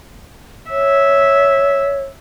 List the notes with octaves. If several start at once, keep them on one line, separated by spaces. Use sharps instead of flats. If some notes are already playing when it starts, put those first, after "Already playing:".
C#5 E5